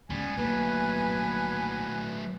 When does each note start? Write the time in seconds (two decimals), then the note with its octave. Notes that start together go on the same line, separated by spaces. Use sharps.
0.10 C#2 A2 G3 B3 G#5
0.37 B1 F#3 A3 A#3 B4